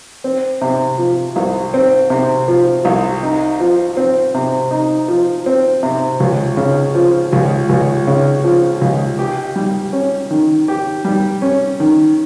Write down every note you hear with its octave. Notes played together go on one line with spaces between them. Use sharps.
C4
C3
F3
C2
C4
C3
F3
C2
D#4
F3
C4
C3
D#4
F3
C4
C3
C#2
C#3
F3
C#2
C#2
C#3
F3
C#2
G4
G3
C#4
D#3
G4
G3
C#4
D#3